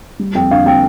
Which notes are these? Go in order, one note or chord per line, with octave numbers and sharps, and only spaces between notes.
G3
F2 G5
D3 F5
C4 G5